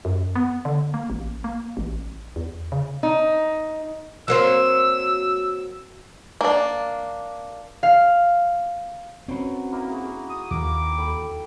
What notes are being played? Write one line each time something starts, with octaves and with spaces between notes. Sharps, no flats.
F#2
B3
D3
A#3
A1
A#3
A1
E2
C#3
D#4
F#3 A#3 C4 E6
A#3 D4
F5
F#3 C4 C#4 B4
A#3 D#4 E4
F#4 G#4
D#6
D#2 A#3 G4 D6
A4 G5 B5